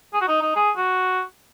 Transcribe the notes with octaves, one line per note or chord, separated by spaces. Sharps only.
G#4
F#4
D#4
D#4
G#4
F#4